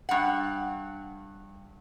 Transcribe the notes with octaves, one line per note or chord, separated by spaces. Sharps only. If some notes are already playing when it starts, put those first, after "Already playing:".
G2 F#5